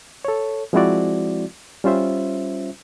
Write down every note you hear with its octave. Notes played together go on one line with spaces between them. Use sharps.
A4 C#5
F3 G#3 C4 E4 F#4 D5
G3 C#4 F4 C5 E5